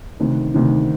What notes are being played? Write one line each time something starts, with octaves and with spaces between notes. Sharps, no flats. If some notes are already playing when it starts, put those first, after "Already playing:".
D2 C3 D#3
D2 C3 D#3